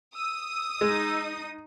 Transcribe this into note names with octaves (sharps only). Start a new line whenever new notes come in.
D#6 E6
G#3 D#4